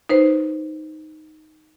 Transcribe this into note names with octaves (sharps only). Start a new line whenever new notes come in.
D#4 B4 C5